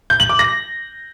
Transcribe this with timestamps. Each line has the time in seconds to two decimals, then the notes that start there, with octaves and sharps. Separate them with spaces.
0.10 G6
0.20 F#7
0.29 D6
0.39 A#6